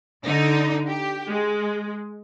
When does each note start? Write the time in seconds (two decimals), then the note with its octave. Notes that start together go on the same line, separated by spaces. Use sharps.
0.24 D3 D#4
0.88 G4
1.27 G#3